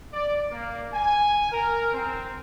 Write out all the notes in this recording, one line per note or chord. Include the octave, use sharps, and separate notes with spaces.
D5
A#3
G#5
A#4
C4